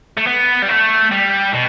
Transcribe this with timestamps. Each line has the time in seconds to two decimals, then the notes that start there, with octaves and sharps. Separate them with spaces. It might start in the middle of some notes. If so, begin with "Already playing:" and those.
0.17 A3
0.27 B3
0.62 G3
0.69 A3
1.11 G3
1.53 B2